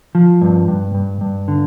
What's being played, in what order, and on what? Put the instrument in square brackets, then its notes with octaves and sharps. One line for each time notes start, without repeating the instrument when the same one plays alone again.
[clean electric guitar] F3
G2
G2
G2
G2
D3